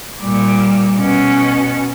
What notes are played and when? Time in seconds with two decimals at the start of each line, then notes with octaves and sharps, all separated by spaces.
0.19 A#2 G3
0.97 B2 C#4